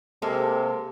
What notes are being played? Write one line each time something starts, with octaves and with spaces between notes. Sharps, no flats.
C3 G#3 A#3 A4